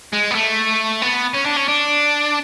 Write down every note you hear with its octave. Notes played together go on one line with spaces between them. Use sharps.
G#3
B3
A3
B3
C#4
D4
C#4
D4